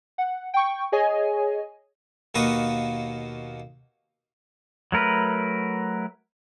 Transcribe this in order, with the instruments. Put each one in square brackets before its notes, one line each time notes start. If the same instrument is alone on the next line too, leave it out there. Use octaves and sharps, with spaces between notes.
[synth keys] F#5
G5 C#6
G#4 C#5 D#5 G#5
[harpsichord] D#2 B2 A#3 B4 C#6 D#6
[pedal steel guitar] F#3 A3 A#4 B4